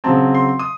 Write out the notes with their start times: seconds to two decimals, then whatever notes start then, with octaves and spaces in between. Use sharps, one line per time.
0.04 C#3 F#3 C4 A5
0.35 C6
0.59 D#6